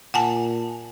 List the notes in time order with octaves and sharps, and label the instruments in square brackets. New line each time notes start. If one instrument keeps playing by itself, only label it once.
[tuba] A#2 [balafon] F#5 G#5 A5